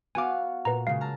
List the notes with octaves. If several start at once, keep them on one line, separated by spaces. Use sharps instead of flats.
B3 F#4 F5 G#5 D6
A#2 B4 A#5
C#3 G#3 F5
A5 A#5 F6